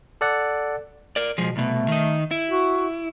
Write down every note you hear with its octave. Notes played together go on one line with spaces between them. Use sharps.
A4 D5 F#5
A#4 D5
B2 F3 G#3
C2 B2 A3
D#3 D#4
E4
F#4